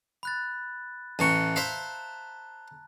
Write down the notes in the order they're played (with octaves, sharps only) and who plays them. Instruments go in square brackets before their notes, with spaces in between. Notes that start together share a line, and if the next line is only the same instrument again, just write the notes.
[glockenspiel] B5 F#6 A6
[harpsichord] A1 E3 C#6 [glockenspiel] A5 A#5 F#6
[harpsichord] C5 E5 F5